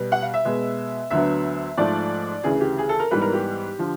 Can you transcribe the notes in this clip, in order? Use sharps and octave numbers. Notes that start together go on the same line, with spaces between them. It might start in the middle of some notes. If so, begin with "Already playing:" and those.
Already playing: B2 G3 B3
F#5
F5
E5
B2 G#3 B3
D2 D3 F#3 B3 E5
G#2 F3 A3 D5
D2 C#3 E3 G#4
G4
G#4
A4
A#4
G#2 E3 G3 B3 B4
A#4
G4
D3 F3